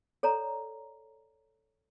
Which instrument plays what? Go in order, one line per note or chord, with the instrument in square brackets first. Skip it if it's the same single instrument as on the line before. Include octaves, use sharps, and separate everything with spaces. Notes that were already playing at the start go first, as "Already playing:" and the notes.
[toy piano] A4 C#5 D5 A#5